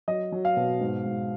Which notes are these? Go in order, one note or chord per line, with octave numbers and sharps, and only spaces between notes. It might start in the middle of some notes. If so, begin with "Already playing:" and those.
F#3 D#5
F#3
F5
B2
G#2
G#2